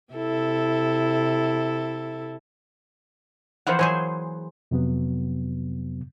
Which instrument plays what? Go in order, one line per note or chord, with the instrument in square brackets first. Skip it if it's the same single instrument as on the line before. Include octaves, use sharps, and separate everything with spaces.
[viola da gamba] C3 E4 A4
[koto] E3 F3 A#3 [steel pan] C5 F#5
[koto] E3 F#3 G#4 [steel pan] C5 G#5
[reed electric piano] F2 C3 F#3 B3